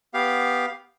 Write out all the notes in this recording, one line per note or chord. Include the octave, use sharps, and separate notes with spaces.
B3 G4 F5